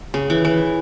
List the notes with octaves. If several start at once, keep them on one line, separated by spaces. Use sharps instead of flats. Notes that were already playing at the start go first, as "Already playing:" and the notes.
C#3
E3
E3